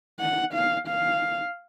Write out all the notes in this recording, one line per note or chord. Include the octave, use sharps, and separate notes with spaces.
F#5
F5
F5